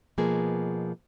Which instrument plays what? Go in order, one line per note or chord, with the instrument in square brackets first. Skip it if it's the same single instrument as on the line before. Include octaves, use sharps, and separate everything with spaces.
[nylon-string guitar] B2 F3 G#3 A#3 B3 G#4